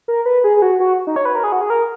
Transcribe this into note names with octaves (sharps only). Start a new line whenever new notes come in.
A#4
B4
G#4
G#4
F#4
F#4
D#4
C#5
B4
A#4
G#4
F#4
G#4
A#4